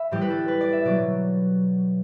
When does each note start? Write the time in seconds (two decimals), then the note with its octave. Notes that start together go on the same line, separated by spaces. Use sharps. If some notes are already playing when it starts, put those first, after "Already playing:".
Already playing: E5 B5
0.11 A2 E3 G3 G4
0.21 B4
0.30 A4
0.48 B4
0.61 D5
0.73 E5
0.85 B2 F#3 D5